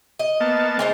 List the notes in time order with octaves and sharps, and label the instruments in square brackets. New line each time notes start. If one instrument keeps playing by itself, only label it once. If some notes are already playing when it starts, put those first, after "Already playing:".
[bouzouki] D#5
[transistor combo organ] A#3 B3 A5
[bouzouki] G#3 D#4 C5